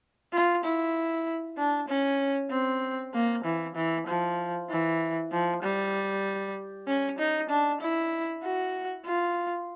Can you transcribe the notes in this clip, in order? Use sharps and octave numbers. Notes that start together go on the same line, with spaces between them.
F4
E4
D4
C#4
C4
A#3
E3
E3
F3
E3
F3
G3
C#4
D#4
D4
E4
F#4
F4